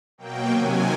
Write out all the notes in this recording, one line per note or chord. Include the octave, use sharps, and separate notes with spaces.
B2 F#3 A#3 G5
C3 D#3 F#3 G#5